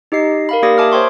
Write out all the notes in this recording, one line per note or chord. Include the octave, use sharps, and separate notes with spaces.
D#4 G4 D#5 C7
A#4 F5 B5
A#3 G4 A#4 D5 D#6 A#6
E5 G#5 A5 D6 D#6 F6
C5 C#5 G5 C6 C#6